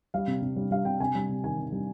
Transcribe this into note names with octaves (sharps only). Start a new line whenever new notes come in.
G3 F5
C3
C3
G3
G3 F5
C3 G5
C3 G#5
G3
C3
D#3 G#5
C3
G3